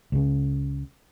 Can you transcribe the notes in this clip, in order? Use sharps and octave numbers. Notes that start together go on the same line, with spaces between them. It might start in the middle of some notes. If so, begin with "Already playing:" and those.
C#2 C#3